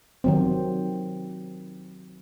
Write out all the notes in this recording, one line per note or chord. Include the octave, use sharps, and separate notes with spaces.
D#3 F#3 C4